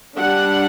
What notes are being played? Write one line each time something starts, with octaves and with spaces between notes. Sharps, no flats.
G3 D4 F#5